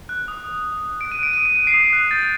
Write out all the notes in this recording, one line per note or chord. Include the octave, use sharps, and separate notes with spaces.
F#6
D#6
D#6
D#6
D#6
F#6 D7
D#7
F#6 D7
D#6 D#7
D7
F#6 D#7
C7 D7
D#6
F#6
G6 A6